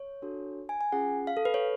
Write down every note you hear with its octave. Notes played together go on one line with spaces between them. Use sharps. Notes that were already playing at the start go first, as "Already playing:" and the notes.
Already playing: C#5
D4 F#4 A4
G#5
G#5
C#4 F4 G#4 F#5
F5
A4
B4
C#5